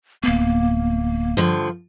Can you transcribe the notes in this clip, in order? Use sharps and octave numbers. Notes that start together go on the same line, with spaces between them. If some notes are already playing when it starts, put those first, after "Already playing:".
D1 A#3 B3
G2 D3 F3